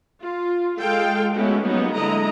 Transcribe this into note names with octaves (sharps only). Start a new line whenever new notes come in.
F4
G#3 F4 A4 F5 G5
G#3 A3 B3 C#4 E4 F#4
F#3 G3 A#3 B3 C#4 D#4
D3 G#3 E4 D#5 A#5